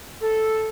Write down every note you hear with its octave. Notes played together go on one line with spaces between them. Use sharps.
A4